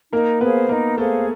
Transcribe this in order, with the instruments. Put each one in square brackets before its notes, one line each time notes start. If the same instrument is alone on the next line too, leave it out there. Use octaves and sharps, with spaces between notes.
[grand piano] A#3 A#4 [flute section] D#4
[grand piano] B3 B4 [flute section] G#4 C5 F5
[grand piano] A#3 A#4 [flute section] D#4
[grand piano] A3 A4 [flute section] G#4 C5 F5